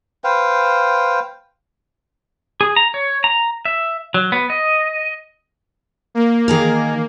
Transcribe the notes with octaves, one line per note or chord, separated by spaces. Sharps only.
B4 C5 F5 G5
G#4
A#5
C#5
A#5
E5
F#3
B3
D#5
A#3
D#3 G#4 A#4